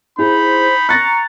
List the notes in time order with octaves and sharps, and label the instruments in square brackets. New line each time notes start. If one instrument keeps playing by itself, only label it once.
[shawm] D#4 [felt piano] E4 G#4 [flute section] C5 [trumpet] B5
[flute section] A#5 [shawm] C#6 [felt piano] F#6 A6 A#6